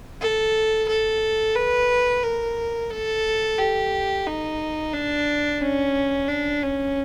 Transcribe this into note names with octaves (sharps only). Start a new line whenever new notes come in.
A4
A4
B4
A#4
A4
G4
D#4
D4
C#4
D4
C#4